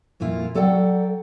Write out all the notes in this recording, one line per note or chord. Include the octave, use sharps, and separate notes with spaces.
F2 A#2 E4 F4
F#3 A4 D5 F#5 G5